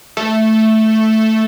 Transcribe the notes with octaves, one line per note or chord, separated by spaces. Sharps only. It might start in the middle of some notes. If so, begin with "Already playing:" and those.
A3